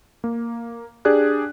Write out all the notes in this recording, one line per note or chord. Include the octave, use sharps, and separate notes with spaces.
A#3
D4 G4 G#4 D5 F#6